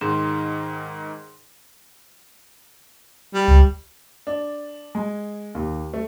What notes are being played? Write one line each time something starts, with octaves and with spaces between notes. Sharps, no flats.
G#2 D#3 D#4 G#4 C6 E7
G3
C#2
D4
G#3
D#2
A3